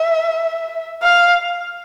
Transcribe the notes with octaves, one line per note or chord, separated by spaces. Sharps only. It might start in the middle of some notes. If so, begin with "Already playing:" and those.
Already playing: E5
F5